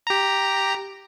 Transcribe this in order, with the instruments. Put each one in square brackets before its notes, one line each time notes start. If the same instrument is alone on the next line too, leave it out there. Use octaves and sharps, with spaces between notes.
[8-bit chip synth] G4 A#5